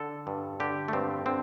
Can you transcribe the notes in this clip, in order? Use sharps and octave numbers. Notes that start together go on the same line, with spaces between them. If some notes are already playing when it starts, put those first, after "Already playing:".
Already playing: D3 A4
G2
D3 G4
A3
G2 C4
D3 C4